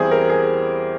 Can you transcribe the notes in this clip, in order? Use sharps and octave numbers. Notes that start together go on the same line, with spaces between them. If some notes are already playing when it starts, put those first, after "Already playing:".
Already playing: E2 E3 G3 C4 E4 G#4
A#4
G#4